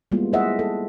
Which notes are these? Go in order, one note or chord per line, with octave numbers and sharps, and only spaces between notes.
G3 G#3 A#3 B3 E4 F4
E4 G#4 C5 D#5 E5 F#5
A4